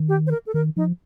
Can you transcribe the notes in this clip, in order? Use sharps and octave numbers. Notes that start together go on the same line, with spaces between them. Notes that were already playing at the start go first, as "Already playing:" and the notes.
Already playing: D#3
G4
C5
A#4
A4
D#3 A#4
F3 D#4